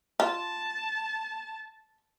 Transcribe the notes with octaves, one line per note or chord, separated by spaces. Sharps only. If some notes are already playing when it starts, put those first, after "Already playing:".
F4 A5